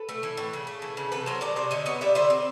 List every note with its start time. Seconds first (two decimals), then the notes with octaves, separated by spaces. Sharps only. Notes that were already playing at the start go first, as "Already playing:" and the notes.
Already playing: A4 B4
0.09 A3
0.23 E3
0.37 A2
0.53 C#3
0.67 A3
0.82 E3
0.97 C#3
1.12 C3 A4 B4
1.26 F#3 A#4 C5
1.41 D#3 C5 D5
1.56 C3 C5 D5
1.71 D3 C#5 D#5
1.86 B3 C#5 D#5
2.01 G3 D5 E5
2.15 D3 C5 D5
2.30 C4